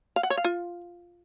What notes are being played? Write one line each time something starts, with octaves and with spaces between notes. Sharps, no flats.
F5
F#5
C#5
F5
F4